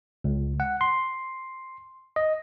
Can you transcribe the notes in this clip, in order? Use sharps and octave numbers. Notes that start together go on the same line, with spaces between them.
C#2
F#5
C6
D#5